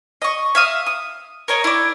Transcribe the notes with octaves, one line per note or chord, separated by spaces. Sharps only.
D#5 C#6
E5 F5 D#6
D#6
A#4 C#5 D#5
E4 D5